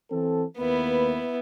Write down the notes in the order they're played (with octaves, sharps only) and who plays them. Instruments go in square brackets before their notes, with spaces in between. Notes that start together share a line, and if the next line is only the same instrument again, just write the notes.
[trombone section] E3 C4 A4
[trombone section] D#2 A#3 B4 [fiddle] B3 E4